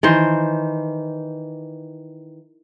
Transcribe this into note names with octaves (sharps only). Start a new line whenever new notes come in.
D#3 E3 C5